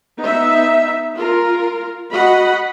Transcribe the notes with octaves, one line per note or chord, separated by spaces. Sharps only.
B3 D#4 E5
F4 A#4
F#4 D#5 F#5 B5